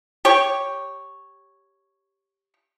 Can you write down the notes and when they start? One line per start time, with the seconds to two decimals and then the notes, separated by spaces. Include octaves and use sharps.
0.25 G4 C#5